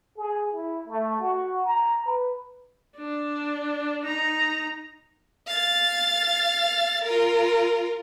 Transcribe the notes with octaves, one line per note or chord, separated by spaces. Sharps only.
G#4
E4
A3
F#4
A#5
B4
D4
D#4 A#5
F5 A6
F4 A#4